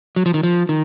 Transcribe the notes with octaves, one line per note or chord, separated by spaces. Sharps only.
F#3
F3
D#3
F3
D#3